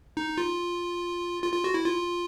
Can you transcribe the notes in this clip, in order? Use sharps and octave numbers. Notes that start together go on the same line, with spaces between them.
D#4
F4
F4
F4
F#4
E4
F4